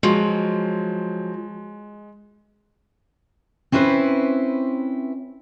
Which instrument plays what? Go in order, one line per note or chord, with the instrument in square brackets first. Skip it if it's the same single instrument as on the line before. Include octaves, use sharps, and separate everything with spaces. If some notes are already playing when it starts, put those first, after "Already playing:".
[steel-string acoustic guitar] F3 F#3 [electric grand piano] G#3
[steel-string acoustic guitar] C4 C#4 E4 B4 C5